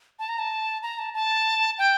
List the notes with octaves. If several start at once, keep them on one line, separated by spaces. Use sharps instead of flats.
A5
A#5
A5
A#5
A5
A5
G5